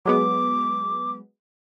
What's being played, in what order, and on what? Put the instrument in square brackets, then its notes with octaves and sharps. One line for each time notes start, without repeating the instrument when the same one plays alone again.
[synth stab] F#3 G#3 B3 [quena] D6